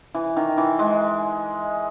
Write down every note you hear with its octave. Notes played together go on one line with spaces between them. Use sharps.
E3
D#3
E3
G#3